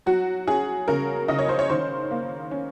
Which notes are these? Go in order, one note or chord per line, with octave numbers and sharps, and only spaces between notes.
F#3 F#4
C#4 G#4
C#3 A#4
C#3 D#5
C#5
C5
C#5
D#3 C5
A#3
C#4